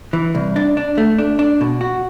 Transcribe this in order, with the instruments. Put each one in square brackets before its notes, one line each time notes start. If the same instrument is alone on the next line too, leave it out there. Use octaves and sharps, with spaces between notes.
[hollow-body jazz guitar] E3
C2
D4
D4
A3
D4
D4
B2
F#4